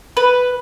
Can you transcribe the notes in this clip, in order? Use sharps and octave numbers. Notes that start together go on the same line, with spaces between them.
B4